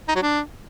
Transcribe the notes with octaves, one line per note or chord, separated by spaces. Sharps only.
D#4
F#3
D4